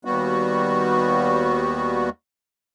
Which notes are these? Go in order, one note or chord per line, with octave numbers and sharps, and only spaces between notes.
D#2 G3 B3 F#4